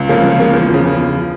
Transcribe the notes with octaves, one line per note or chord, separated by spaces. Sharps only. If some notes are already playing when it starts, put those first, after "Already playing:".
Already playing: C#2
C#3 F3 A#3
C#2
C#3 F3 A#3
E2
F3
C#3
E2
C#3 F3